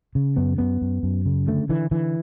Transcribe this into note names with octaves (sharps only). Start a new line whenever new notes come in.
C#3
F#2 B3
F#2 B3
F#2
F#2
C#3
D3 A3
D3 E3
D3 E3